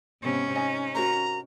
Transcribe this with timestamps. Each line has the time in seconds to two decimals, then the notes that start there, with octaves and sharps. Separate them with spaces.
0.22 G#2 C3 B3 C#4
0.55 D#4 D#5 G#5
0.95 F#4 A#4 C5 A#5